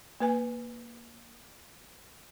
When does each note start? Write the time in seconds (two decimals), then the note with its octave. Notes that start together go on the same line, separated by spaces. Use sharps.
0.20 A#3 B4 G#5